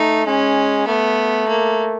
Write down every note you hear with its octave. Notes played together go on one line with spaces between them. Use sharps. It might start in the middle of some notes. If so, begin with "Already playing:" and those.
Already playing: A3 D#4
G#3 C#4
A3 B3
A#3